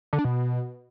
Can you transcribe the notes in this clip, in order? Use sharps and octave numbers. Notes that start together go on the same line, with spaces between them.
D3
D4
B2